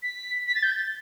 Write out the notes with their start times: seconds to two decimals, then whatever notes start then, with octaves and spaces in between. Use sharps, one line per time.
0.03 B6
0.46 B6
0.55 A6
0.63 G6
0.71 A6